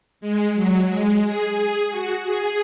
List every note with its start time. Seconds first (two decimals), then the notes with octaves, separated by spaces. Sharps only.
0.21 G#3
0.55 F#3
0.89 G#3
1.23 G#4
1.56 G#4
1.90 F#4
2.23 G#4